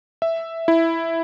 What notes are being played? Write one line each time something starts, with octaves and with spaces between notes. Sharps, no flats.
E5
E4